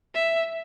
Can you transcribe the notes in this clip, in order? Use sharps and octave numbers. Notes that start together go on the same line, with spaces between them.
E5